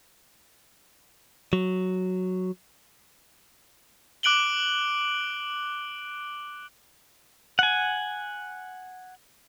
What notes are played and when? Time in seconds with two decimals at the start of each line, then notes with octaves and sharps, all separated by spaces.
1.53 F#3
4.23 D6 F#6 D7 F#7 G7
7.59 F#5 G#5